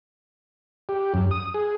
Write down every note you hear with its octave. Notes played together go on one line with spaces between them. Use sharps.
G4
F#2
D#6
G#4